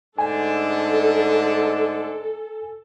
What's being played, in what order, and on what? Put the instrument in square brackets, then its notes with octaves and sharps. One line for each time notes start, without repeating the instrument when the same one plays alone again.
[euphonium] G#2 [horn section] D3 A3 D4 [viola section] A4 [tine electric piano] G#5